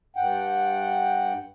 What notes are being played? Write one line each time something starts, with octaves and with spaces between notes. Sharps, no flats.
G2 F#5 G5